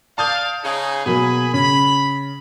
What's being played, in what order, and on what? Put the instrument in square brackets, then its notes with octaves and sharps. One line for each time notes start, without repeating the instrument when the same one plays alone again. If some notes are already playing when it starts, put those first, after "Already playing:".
[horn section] D5 F5 [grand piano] A5 D#6 G6
[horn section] C#3 D#4 G#4
[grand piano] B2 F#3 A#3 [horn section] G#4 G#5 B5
[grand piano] C#3 C#4 [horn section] B5